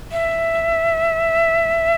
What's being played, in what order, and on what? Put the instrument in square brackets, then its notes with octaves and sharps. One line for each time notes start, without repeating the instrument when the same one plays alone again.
[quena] E5